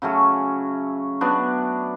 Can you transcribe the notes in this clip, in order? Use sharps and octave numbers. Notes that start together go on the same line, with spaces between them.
C#3 F#3 A3 C#4
F#3 B3 D4